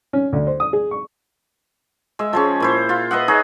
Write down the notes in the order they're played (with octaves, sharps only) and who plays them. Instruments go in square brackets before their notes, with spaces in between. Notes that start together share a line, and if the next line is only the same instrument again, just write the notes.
[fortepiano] C#4
D2
C5
D#6
G#4
C#6
[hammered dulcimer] G#3 E5
F3 G#3 C#4
A#2 E4 C5
F4
B4 D#5 E5 F#5
D#4 G#4 C#5